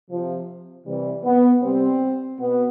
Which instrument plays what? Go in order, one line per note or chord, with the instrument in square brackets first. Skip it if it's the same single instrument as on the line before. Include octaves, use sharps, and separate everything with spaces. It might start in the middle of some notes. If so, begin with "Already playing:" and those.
[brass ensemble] C3 F3
C3 E3 G3
B3
C3 G3 C4
B2 B3